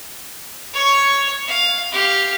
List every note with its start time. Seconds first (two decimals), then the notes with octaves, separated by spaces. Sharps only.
0.74 C#5 C#6
1.47 F5
1.92 G4 F5